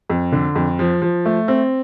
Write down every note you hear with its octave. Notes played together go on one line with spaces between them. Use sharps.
F2
D3
F2
F3
F3
A3
C4